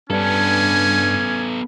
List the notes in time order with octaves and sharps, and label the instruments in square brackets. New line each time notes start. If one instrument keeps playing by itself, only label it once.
[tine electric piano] G2 D4 [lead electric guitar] B3 A4 [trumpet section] C#4 G#5